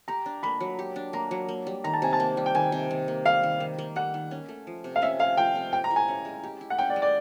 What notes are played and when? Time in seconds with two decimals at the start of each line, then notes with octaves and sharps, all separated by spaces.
0.08 G4 A#5
0.26 D4
0.43 A#3 B5
0.60 F#3
0.79 G4
0.96 D4
1.13 A#3 A#5
1.31 F#3
1.49 A#3
1.67 G3
1.84 D#3 A#5
1.93 A5
2.02 C3 G#5
2.13 A5
2.20 A#3
2.37 G3
2.46 G5
2.55 D#3 G#5
2.72 C3
2.91 D#3
3.08 A#3
3.26 G3 F5
3.43 D#3
3.60 D#3
3.78 A#3
3.96 G3 F#5
4.14 D#3
4.31 C#4
4.49 A3
4.67 F3
4.84 C3
4.96 F5
5.02 C#4 E5
5.19 A3 F5
5.37 F3 G5
5.55 C3
5.73 G4 G5
5.84 A#5
5.91 E4
5.96 G#5
6.08 C#4
6.25 G#3
6.43 G4
6.61 E4
6.70 F#5
6.78 C#4 G5
6.90 D5
6.96 G#3
7.02 D5